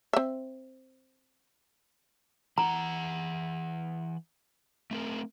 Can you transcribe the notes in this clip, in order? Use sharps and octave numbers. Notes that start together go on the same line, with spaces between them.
C4 E5
E3 F#5 A#5
A3 C4 A#4